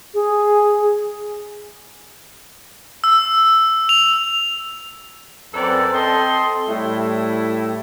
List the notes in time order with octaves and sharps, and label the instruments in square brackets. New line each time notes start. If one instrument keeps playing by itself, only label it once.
[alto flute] G#4
[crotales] E6
F7
[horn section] F#2 C4 A4 B4 D5
C4 A4 D#5 C6
A2 G3 A3 E4